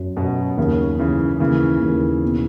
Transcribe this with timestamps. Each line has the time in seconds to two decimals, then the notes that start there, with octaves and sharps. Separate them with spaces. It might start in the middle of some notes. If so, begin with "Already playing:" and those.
Already playing: F#2
0.17 F#2 B2
0.57 D#2 C#3
0.98 D#2 C#3 E3
1.40 D#2 C#3 E3
1.82 D#2
2.23 B2